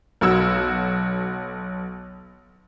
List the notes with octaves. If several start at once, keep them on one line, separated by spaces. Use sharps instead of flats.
B1 F#4 E6 G#6